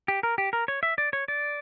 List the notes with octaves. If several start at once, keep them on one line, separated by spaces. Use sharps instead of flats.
G4
A#4
G4
A#4
C#5
E5
D5
C#5
D5